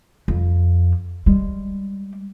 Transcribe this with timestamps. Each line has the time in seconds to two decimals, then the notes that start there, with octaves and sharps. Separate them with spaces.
0.28 F2
1.26 G3 G#3